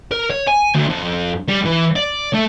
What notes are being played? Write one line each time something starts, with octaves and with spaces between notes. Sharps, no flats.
A#4
C#5
G#5
D2
F2
G3
E3
D5
A3